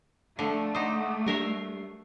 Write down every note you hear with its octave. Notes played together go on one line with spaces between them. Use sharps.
D3 F3 A3
D#4 C5 F#5 D6 D#6
F#3 G3 D4 A#4 E5 C7